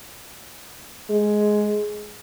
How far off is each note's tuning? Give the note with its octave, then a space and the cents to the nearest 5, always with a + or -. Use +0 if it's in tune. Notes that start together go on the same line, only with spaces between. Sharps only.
G#3 +10